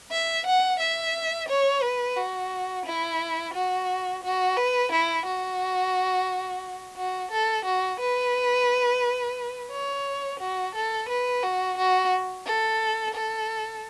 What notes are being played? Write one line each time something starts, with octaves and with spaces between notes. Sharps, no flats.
E5
F#5
E5
C#5
B4
F#4
E4
F#4
F#4
B4
E4
F#4
F#4
A4
F#4
B4
C#5
F#4
A4
B4
F#4
F#4
A4
A4